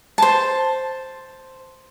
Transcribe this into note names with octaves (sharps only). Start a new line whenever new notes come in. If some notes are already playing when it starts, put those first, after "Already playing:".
C5 A5